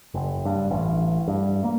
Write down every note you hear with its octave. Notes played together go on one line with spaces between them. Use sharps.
F#1
G2
A1
G2
A#3